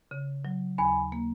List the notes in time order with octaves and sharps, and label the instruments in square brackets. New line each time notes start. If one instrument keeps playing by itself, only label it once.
[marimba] C#3
F#3
[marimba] D#2 [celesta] G#5 B5
[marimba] A#3